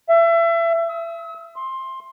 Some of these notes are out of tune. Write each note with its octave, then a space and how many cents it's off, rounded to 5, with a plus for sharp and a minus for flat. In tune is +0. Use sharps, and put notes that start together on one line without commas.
E5 +30
E6 -45
C6 +15